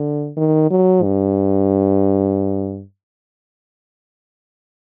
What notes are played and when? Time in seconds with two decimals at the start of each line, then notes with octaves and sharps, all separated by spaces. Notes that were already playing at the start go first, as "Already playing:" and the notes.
Already playing: D3
0.37 D#3
0.71 F#3
1.03 G2